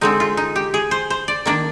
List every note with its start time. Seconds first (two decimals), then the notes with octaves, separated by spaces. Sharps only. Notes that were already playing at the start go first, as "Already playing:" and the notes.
0.01 D3 G#3 C4 D#4
0.20 F4
0.37 D#4
0.56 G4
0.74 G#4
0.91 C5
1.10 C5
1.28 D5
1.46 D#3 A#3 D4 D5